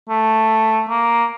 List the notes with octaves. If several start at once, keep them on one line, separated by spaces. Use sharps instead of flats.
A3
A#3